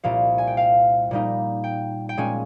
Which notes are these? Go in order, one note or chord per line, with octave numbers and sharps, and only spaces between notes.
C2 A#2 G3 C4 F5
G#5
G5
F5
A#2 G3 A#3 D#4
G5
G5
A#2 G#3 C#4 G#5